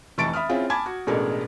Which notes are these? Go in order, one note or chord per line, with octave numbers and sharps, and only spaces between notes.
F1 E3 A5 C#6 A6 D7
E5 B5 D#6 F6
C4 C#4 E4 F4 G#4
G#5 A5 B5 D6 G#6
F#4
A1 B2 G#3 D4 A4 A#4